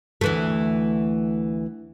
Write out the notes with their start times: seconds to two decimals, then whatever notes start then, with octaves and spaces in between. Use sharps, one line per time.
0.21 D2 E3 A3